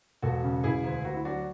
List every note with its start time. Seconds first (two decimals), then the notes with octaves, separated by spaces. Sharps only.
0.22 E1 F#4 A4
0.43 C#3
0.64 E1 E4 G#4
0.84 D2
1.05 D2 F#4
1.14 E4
1.25 F#3 D4 F#4